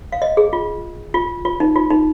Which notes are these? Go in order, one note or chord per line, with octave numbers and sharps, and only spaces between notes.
F5
D#5
G#4
F4
F4
F4
D#4
F4
D#4